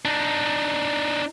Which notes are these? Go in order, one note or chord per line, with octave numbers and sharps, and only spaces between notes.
D4 D#4